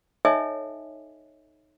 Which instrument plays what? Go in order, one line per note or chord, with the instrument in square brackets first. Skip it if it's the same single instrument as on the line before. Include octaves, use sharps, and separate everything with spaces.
[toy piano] D#4 A4 C#5 D#5 E5 G#5